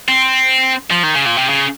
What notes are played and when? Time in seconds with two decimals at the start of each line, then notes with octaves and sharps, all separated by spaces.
0.08 C4
0.91 F3
1.03 D#3
1.15 C#3
1.26 A#2
1.38 C3
1.49 C#3